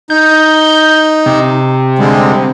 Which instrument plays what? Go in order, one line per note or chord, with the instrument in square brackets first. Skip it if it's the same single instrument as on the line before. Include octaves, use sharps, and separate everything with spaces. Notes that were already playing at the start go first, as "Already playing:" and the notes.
[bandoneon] D#4 [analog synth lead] G6
[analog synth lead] C3
[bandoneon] D3 G3 G#3